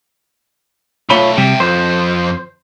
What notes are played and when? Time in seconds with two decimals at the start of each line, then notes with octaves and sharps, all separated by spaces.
1.10 B1 A3 F4 C#5 B5
1.38 C3 G3 E5 G5
1.60 F2 C5